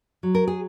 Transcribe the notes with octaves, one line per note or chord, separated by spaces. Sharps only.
F#3
A#4
G#4